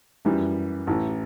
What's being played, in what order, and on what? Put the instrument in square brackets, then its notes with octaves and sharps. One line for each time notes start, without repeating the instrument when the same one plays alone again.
[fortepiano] F#2 E3 G3
A1 A2 E3